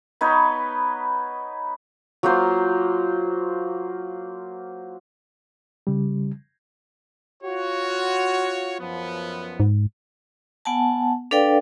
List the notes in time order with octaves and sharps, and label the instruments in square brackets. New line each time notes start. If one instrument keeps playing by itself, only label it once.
[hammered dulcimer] B3 D#4 B4 C#5
[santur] F#3 A#3 F4 C5
[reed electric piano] C#3 G3
[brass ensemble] F4 F#4 C#5
F#2 F3 B3
[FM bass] G#2
[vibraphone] B3 F#5 G#5 A5
D4 A4 B4 D5 F5 G5